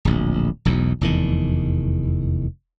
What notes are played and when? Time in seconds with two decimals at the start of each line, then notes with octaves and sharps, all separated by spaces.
0.05 D1 A#1
0.65 E1 B1 E2
1.01 F1 E2 D#3